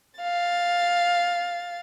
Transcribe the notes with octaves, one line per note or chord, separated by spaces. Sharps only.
F5 A6